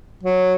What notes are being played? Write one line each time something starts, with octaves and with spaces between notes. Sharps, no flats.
F#3